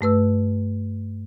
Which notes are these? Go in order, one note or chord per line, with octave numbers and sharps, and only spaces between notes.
G2 A3 B4 E6